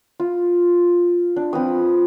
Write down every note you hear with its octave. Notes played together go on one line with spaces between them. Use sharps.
F4
D4
F3 C4 B4 D#6